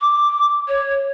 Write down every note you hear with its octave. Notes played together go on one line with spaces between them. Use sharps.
D6
C#5